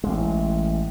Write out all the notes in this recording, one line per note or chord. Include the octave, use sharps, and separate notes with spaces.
A1 G#3